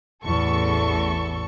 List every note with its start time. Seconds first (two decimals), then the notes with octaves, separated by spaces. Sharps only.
0.23 A1 E2 A4 C#6